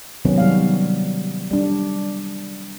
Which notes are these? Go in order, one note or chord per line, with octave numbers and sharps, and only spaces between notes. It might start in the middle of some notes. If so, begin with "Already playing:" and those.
C3 D#3 F#3 B3 C#4
G3 F5
G3 D4